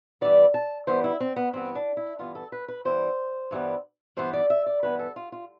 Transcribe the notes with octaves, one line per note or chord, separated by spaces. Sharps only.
G2 E3 G3 B3 D5
A5
G2 E3 G3 B3 C5
E4
C4
B3
G2 E3 B3 C4
D4
E4
G2 E3 B3 F4
A4
B4
B4
G2 E3 G3 B3 C5
G2 E3 G3 B3
G2 E3 B3 C5
D5
E5
D5
G2 E3 B3 B4
A4
F4
F4